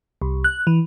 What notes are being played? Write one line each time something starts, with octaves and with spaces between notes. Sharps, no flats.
C2
F#6
E3